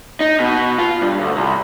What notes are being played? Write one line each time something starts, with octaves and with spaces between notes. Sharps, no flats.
D#4
B2
F4
G2
D2
C2